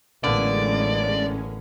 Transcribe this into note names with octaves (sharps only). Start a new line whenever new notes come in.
A1 D3 G#3 A#3 B3 C#4 D5